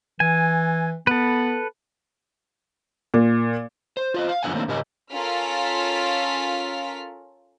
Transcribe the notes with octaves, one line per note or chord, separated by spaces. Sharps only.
E3 G#5
B3 A4 B4
A#2
C5
F4 C5 D#5
F5
F#2 F3 B3 D4 F#5 G#5
D#3 A3 A#3 C4 D4
G#2 C#3 G4 A#4 D#5 G#5
C#4 F4 A4 A#4 F6 B6